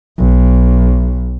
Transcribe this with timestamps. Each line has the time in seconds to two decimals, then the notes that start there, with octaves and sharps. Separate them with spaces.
0.19 B1